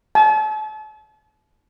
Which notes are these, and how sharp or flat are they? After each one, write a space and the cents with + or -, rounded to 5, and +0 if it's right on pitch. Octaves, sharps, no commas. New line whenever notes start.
A5 -40